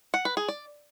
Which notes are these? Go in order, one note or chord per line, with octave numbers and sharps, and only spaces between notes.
F#5
B4
G#4
D5